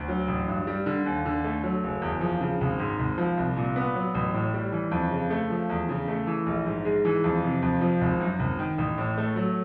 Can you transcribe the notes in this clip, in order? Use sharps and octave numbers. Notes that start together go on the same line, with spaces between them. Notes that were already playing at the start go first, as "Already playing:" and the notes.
Already playing: D2
F#3
A1
G2
G3
D3
D#2
D3
A3
F#3
F#1
E2
F3
C#3
G#1
G#2
G#1
F3
C2
A#2
B3
F#3
A1
A2
G3
E3
F2
C#3
A3
F3
E2
C#3
A3
E3
A#1
G#2
G#3
E3
F2
C3
F2
F3
G#1
F#2
G#1
D#3
A1
A2
A3
F#3